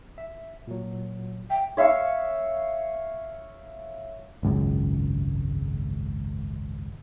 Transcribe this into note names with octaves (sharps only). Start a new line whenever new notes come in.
E5
A#2 F#3
E5 G5
C#5 E5 F5 C#6
G#1 C#2 F#2